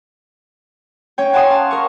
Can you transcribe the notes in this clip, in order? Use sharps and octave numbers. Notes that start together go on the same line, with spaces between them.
C#4 C#5 G5
F#5 G#5 A5 C6 C#6 D#6
F5 A5
A#4 C#6